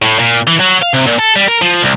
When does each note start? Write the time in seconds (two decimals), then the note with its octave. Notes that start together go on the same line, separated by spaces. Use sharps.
0.02 A2
0.19 A#2
0.47 E3
0.60 F#3
0.82 F5
0.94 C3
1.06 A#2
1.19 A4
1.36 G3
1.48 A#4
1.62 F3
1.82 C2